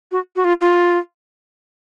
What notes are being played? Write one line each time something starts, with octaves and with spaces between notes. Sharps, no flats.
F#4
F#4
F4
F4